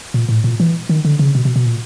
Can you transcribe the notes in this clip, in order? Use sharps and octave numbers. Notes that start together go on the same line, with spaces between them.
A#2
A2
A#2
E3
D#3
D3
C#3
B2
B2
B2
A#2